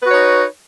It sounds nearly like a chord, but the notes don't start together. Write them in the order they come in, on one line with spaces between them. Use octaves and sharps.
B4 F#4 C#5 D#4